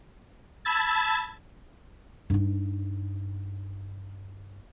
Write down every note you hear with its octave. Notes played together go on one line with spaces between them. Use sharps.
A5 B5 E6 G#6 A6
G2 D#4